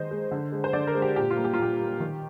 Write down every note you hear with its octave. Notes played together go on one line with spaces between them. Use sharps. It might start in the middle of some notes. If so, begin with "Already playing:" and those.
Already playing: D#3 G#3 C5 D#5
G#3
D3
G#3
C5
D3 D5
A#4
G#3
G4
A#2 G4
F4
G3 A#3
G4
F4
A#2 G4
G3 A#3
D#3